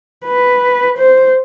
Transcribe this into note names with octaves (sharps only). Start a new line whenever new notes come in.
B4
C5